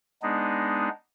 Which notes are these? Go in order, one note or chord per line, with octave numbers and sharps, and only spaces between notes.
G#3 B3 D4 D#4